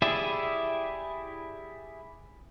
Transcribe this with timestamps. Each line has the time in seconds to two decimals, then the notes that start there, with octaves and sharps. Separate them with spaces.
0.02 E4 G4 G#4 D5 E5